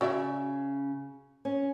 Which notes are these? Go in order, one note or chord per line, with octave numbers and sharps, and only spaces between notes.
C#3 F#4 D5 E5
C#4